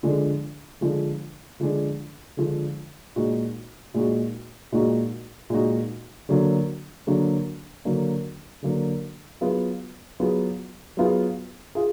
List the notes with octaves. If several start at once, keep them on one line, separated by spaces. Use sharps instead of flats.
D3 F3 G#3 D4
D3 F3 G#3 D4
D3 F3 G#3 D4
D3 F3 G#3 D4
A#2 G#3 D#4 F#4
A#2 G#3 D#4 F#4
A#2 G#3 D#4 F#4
A#2 G#3 D#4 F#4
D3 F#3 A#3 D4
D3 F#3 A#3 D4
D3 F#3 A#3 D4
D3 F#3 A#3 D4
F#3 B3 F4 G#4
F#3 B3 F4 G#4
F#3 B3 F4 G#4
F4 G#4